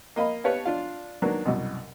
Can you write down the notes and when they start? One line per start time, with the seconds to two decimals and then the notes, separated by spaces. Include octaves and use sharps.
0.16 A#3 D#5 F5 B5
0.44 B3 G4 B4 C#5 F5 A5
0.65 D4 F4 F5
1.22 D#3 F#3 A#3 B3 D4
1.45 C2 F#2 B2